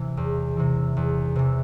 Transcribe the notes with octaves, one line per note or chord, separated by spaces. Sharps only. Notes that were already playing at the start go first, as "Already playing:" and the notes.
Already playing: C3 E3
E2
C3 E3
E2
C3 E3